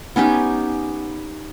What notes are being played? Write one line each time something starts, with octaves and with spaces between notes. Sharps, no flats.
B3 C#4 D#4 G4